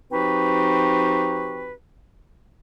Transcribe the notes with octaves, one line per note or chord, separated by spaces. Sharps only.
F3 C4 D#4 F#4 G4 B4